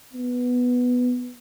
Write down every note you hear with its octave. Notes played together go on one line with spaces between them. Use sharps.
B3